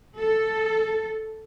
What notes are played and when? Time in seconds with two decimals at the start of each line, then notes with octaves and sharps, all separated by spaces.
0.18 A4